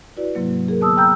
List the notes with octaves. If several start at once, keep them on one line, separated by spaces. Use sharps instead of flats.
E4 F#4 B4 D5
G#2 C3 F#3 A#3
G#4 A#4
D3 B3 A5 D#6 E6
G5 A#5 B5 E6 F6 G6